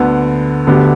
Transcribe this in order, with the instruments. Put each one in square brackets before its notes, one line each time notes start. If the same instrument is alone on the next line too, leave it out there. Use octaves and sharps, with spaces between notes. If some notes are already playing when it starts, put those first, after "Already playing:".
Already playing: [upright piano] D2 D3 B3
D2 D3 B3 G4